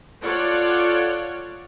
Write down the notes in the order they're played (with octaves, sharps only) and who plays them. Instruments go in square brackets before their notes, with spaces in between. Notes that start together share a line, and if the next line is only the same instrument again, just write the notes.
[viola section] F4 A4 C#5 D5 F#5